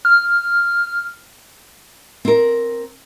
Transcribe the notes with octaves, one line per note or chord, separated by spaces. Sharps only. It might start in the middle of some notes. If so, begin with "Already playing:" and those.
F6
C4 A#4